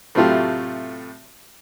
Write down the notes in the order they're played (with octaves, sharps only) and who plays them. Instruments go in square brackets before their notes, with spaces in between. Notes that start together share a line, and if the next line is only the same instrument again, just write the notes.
[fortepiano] A2 C3 F#3 A3 F4 G4